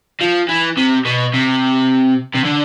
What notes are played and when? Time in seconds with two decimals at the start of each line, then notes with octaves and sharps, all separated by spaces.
0.21 F3
0.49 E3
0.77 C3
1.05 B2
1.34 C3
2.34 C3
2.44 D3